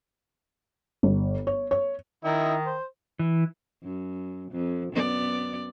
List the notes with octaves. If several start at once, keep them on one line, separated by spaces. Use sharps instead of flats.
G1
C#5
C#5
D#3 D#4 E4
C5
E3
F#2
F2
F#2 B3 D5